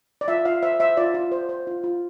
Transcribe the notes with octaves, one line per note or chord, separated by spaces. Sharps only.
D5
F4 E5
F4 F5
C5 E5
C5 E5
F4 D5
F4
C5
C5
F4
F4